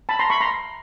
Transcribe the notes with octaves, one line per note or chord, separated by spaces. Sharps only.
A5 B5
A#5 C6
B5 C#6
A#5 C6